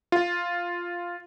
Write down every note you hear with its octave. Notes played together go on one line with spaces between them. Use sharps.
F4